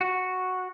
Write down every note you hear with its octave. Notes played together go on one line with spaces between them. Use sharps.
F#4